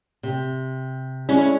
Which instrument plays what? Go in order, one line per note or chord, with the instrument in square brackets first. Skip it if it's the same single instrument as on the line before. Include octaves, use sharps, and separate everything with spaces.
[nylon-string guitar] C3
[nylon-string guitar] G#3 D4 E4 [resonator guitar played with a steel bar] C#4